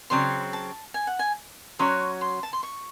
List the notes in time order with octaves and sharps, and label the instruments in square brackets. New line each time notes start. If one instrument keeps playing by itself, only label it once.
[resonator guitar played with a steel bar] C#3 F#3 C4 [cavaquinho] C6
[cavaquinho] A5
G#5
F#5
G#5
[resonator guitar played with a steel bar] F#3 C#4 F#4 C#5 [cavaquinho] C6
[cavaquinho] C6
A5
C6
C#6